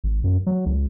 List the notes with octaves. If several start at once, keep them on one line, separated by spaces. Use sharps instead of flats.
G#1
F#2
F#3
C#2